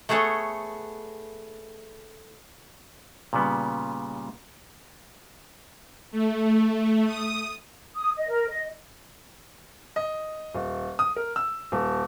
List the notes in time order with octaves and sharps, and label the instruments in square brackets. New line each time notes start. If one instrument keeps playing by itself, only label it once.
[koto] A3 B3 G#4 A4 C#5
[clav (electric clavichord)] A#2 C#3 G3 B3
[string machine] A3
D#6
[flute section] D#6
D#5
A#4
D#5
[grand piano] D#5
D#1
D#6
A#4
E6
D#1